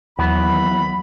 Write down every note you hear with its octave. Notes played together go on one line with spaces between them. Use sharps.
D#2 E3 F#3 B3 B5